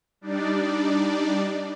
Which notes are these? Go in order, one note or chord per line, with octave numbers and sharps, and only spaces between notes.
G3 D4 D#4 D5